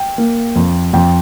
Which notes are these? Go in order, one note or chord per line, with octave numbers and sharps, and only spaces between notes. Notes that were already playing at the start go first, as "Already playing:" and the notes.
Already playing: G5
A#3
F2
F2 G5